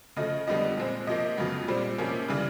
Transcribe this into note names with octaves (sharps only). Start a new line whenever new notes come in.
C#3 F3 A3 D#5
F2 D3 G3 B3 D#5
A#2 F3 G#3 C4
C3 F3 A#3 D#5
F2 C#3 F#3 B3
A#2 G3 C4
C3 F3 A#3 C#4
C#3 E3 G3